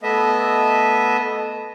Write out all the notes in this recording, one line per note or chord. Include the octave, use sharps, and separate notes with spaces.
A3 B3 D#5 E5